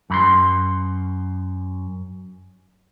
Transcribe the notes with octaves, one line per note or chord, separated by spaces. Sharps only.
F#2 B5 C6